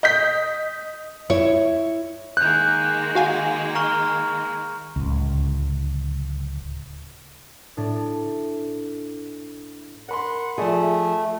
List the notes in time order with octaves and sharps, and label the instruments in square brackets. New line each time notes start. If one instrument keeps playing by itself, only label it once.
[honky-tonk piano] D#5 G6 B6
[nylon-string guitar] E4 C#5
[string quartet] D#3 G#3 A#3 [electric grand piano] F#6 [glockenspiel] G6
[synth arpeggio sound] F#4 F5 G#5
[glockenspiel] A#5 C#6 F6
[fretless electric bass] D1 C#2
[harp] A2 D4
[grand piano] A#4 B5 C6 [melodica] F#5
[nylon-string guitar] F3 G#4 [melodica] A3 [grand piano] D5 E5